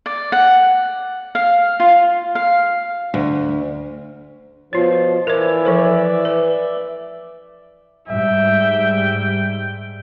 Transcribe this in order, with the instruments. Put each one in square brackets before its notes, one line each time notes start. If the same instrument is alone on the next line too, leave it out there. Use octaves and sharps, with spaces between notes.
[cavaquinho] D5
F#5
F5
F4
F5
[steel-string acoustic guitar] D2
[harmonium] B2 F3 C5 [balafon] F4 C#5
[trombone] E3 [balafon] A#4 C5 [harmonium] D5 E5
[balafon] F3 A4 C5
B4
[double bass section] G#2 G3 [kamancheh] E5 [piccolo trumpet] G5